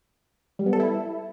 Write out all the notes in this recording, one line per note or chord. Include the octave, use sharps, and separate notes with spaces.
G3
B3
A4
E4